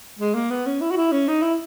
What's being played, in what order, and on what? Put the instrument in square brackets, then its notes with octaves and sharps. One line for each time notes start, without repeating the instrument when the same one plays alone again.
[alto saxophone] G#3
A#3
B3
C#4
E4
F#4
E4
C#4
D#4
E4